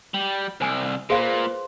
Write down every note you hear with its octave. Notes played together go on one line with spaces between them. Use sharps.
G3
C2 C5 G#5 D6
A#2 G#4 B4 C5 F5